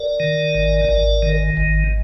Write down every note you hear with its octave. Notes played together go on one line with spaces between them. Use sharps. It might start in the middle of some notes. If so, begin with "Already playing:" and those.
Already playing: A#4 D5
D#3
G#1
G#1
D#3
G#1